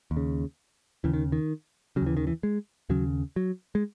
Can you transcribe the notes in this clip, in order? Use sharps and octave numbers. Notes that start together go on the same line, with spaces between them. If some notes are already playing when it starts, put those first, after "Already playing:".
D#2
C#3
D#2 C#3 E3
D#3
D#3
C#3 F#3
D#2 E3
D#3
E3
G#3
D#2 C#3 F#3
F#3
G#3